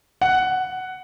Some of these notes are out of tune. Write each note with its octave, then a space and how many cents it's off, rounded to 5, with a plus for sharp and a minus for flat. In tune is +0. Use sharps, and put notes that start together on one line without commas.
F#5 +5